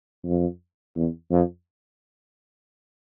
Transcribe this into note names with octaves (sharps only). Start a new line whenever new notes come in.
F2
E2
F2